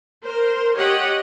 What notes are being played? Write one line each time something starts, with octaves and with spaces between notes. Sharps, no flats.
A#4 C5
G4 C#5 D#5 F#5